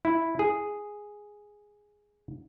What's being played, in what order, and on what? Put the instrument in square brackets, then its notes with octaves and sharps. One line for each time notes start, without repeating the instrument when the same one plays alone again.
[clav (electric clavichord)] E4
G#4